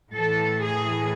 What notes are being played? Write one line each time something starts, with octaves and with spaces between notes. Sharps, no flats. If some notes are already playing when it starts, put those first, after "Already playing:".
A2 E3 A4
G#4